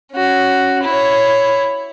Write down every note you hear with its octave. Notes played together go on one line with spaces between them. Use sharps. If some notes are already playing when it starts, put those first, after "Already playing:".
C#4 F#4
E4 C#5